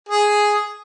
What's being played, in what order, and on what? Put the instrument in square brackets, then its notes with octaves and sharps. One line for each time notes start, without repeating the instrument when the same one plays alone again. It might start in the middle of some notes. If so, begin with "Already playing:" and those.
[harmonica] G#4